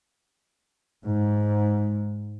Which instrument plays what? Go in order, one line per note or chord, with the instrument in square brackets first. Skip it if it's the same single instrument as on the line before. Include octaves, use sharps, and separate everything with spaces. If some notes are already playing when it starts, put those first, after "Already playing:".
[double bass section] G#2